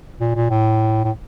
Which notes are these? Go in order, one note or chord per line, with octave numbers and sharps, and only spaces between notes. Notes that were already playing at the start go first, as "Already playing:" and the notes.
A#2
A#2
A2
A2